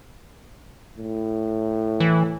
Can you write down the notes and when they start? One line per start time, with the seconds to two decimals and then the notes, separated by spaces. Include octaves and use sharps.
0.98 A2
2.00 E3